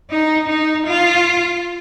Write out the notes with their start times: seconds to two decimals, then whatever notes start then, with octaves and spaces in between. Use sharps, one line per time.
0.10 D#4
0.48 D#4
0.87 F4